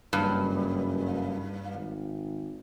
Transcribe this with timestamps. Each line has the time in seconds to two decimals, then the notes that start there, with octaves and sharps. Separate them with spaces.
0.13 F#1 G2
1.73 G#1